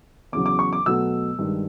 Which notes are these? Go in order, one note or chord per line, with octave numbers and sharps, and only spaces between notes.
E2 C#3 F#3 D6
D6
C#6
D6
B2 F#3 A3 E6
G2 D#3 G#3